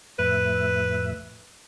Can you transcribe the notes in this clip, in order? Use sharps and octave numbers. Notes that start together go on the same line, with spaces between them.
F2 A2 B4 E5